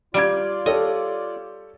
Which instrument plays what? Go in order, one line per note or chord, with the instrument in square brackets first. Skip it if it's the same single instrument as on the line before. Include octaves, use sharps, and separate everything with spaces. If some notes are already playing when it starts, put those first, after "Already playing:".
[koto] G3 G4 [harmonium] F4 D5 [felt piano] G#6 D7
[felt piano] G4 A4 C#5 [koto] D#5